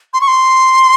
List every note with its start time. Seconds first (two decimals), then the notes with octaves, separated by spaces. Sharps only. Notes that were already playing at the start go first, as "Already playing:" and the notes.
0.14 C6
0.21 C#6
0.28 C6